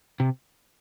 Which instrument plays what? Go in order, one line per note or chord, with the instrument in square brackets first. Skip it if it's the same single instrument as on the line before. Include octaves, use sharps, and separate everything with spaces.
[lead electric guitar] C3